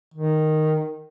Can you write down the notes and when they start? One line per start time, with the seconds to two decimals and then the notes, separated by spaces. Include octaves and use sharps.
0.14 D#3